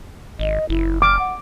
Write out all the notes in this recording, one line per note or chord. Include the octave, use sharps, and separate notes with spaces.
G#1 D#5
F#1 E4
D6 F6
F#5